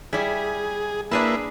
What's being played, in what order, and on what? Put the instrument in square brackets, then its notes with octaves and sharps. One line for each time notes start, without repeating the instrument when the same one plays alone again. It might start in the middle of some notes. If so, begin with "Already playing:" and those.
[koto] G3 E4 [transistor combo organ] G#4
[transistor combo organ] A#3 E4 B4 [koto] D4 G#4 A5